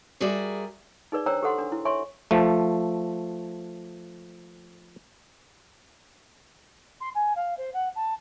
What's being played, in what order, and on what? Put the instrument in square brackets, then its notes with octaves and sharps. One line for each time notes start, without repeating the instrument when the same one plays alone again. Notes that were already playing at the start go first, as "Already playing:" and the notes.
[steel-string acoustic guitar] G3 F#4 G#4 A#4 D5 E5
[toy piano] D#4 G#4 B4 D5
D4 C5 C#5 G5 A#5 E6
G4 A4 F#5 C6
D4
E4
C#5 E5 G#5 C6 C#6
[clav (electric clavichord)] F3 A3
[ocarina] C6
G#5
F5
C5
F#5
A5